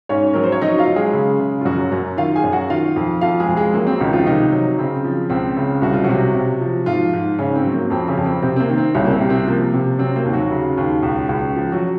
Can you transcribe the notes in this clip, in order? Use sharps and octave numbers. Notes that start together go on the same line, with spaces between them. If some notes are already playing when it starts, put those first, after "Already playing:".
G#2 C#4 C#5
F#3 A#4
C5
C#5
F#3 D#4 D#5
F4 F5
F#3
G#3 G#4
C#3
C#3
F4
F#2 F#3 F#4
F#2
D#3 F4 F5
G#4 G#5
F#2
F#4 F#5
D#3 F4 F5
F2
F2 F4 F5
G#3 G#4
F2
G#3 G#4
F#3 A#3
C4
C#2 D#3 D#4
F3 F4
C3 D#3 D#4
F#3
C#3 C4
F3
C#2 C4
C#3
C2 F#4
F4
C3 F#3 F#4
C3
F3
G#2 F3 F4
G#2
G#2 C#3 C#4
C4
F#3
A#3
F2 C4
C#3 C#4
F2
C4
C3 C4
C4
A#3
D#3
C4
C2 C#3 C#4
A#3
C4
C3
C4
F3 A#3
C3
F#3 C4
A#3
D#2
F#3 F#4
C#3
D#2
C#2
C#2
F3
F#3 F#4